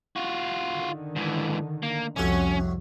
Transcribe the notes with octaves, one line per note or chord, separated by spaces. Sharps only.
F4 F#4
D3 D#3
G#2 E3
A#3
C2 F2 A2 C#4 F#4